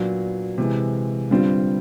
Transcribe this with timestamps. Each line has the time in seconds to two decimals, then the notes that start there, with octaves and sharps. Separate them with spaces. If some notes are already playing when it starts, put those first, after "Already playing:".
Already playing: A#2 F#3 B3 D4
0.58 C3 E3 G#3
1.31 G2 D3 G3 C4 F4